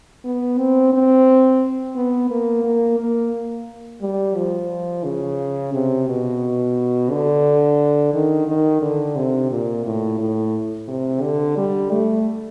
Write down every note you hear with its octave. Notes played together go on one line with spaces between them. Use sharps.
B3
C4
C4
B3
A#3
A#3
A#3
G3
F3
C#3
C3
B2
D3
D#3
D#3
D3
C3
A#2
A2
A2
C3
D3
G3
A3